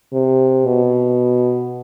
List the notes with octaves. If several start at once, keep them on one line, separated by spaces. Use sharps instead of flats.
C3
B2